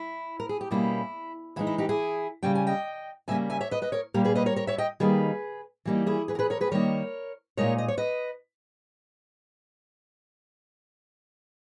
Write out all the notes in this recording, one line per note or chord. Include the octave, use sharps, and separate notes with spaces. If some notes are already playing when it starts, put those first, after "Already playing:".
Already playing: E4
A#4
G#4
G4
B2 G3 A#3 C#4 E4
E3 G#3 D#4 E4
E4
D#4 G4
E4 G#4
C#3 E3 G3 C#4 G5
G#5
D#5 G5
C#3 G3 A#3 C#4 E5 G#5
E5 G#5
C#5 E5
B4 D#5
B4 D#5
A#4 C#5
A#2 G3 A#3 G4 A#4
G#4 B4
B4 D#5
A#4 C#5
A#4 C#5
C#5 E5
D#5 G5
D#3 G3 A#3 D#4 G#4 B4
E3 G3 A#3 D#4
E4 G#4
G#4 B4
A#4
G#4 B4
A#4 C#5
G#4 B4
D#3 G3 A#3 D#4 A#4 C#5
A#2 G#3 D#4 A#4 C#5
D#5
C#5
B4 D#5